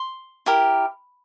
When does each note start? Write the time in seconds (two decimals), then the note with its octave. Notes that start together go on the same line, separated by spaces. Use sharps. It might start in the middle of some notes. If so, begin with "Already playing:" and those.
Already playing: C6
0.46 E4 G4 A#4